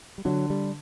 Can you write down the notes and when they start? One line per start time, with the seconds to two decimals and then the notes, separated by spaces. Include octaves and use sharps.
0.18 G3
0.25 D3 F#3
0.50 G3